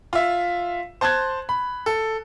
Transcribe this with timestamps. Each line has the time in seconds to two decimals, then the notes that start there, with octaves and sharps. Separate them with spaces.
0.13 F4 E5
1.01 C5 A5 C6 F#6 G#6
1.49 B5
1.86 A4